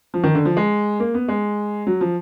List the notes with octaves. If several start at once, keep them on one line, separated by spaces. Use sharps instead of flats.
F3
D#3
D3
F3
G#3
A#3
B3
G#3
F#3
F3